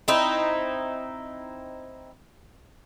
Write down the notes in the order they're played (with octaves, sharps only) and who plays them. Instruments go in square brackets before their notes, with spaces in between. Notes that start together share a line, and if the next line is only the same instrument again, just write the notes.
[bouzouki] C4 D#4 E4